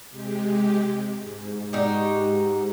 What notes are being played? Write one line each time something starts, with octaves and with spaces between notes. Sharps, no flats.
C3 G#3 G4
G#2
D#4 F#4 G4